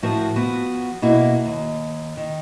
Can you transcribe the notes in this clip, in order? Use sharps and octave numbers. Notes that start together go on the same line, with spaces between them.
A2 F3 F#4 A#4 C5 A5
F3 B3 F#4
B2 A#3 E4 F#4
D#2
D#3